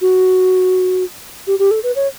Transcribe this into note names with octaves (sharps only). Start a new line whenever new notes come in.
F#4
G4
G4
A4
B4
C#5